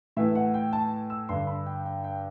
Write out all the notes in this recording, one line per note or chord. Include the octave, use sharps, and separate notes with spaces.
A2 E3 E5
F#5
G5
A5
E6
G2 D3 C6
B5
G5
G5
G5